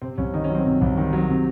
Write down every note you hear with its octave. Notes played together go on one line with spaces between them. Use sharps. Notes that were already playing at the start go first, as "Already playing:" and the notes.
C3 C4
C2 C#4
D#3 D#4
C#4
F#3 C4
C3
C2
D#3
F#3
C3